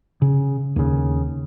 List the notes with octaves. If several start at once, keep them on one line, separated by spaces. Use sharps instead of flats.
C#3
D#2 C#3